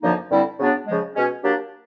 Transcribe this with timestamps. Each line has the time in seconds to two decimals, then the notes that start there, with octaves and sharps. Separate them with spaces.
0.03 F#2 D3 F3 A#3 D#4
0.31 G2 D3 G3 C4 E4
0.59 C#3 F#3 B3 D4
0.87 C#3 F3 G#3
1.15 B2 G#3 C#4
1.43 F#3 A#3 D4 G4